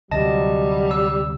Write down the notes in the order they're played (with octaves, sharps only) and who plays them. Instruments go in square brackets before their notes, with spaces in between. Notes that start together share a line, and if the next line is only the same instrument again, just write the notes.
[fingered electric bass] D2 C3 [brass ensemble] F#3 [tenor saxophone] G3 [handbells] D#5 A5
[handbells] E6